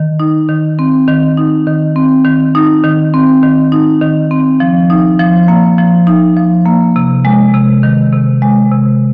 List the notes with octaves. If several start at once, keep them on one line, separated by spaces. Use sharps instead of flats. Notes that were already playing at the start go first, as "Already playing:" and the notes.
Already playing: D#3
D#4
D#3
C4
D#3
D#4
D#3
C4
D#3
D#4
D#3
C4
D#3
D#4
D#3
C4
F3
D#4
F3
A#3
F3
D#4
F3
A#3
C3
G#3
C3
D#3
C3
G#3
C3